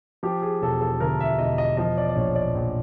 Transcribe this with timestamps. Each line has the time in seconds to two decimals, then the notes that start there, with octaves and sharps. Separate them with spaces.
0.23 F3 G4
0.42 G#4
0.62 E1 A4
0.81 A4
1.00 D2 A#4
1.20 E5
1.39 E1 D#5
1.58 D#5
1.77 F3 D#5
1.98 D5
2.09 D5
2.16 A#1 C#5
2.35 D5
2.55 A#1